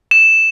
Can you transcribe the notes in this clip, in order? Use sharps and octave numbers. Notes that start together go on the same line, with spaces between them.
E7